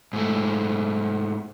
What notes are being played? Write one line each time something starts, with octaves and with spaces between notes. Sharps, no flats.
G#2 A3